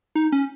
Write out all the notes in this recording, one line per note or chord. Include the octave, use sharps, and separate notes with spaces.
D#4
C#4